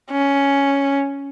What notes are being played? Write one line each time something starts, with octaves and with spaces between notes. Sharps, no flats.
C#4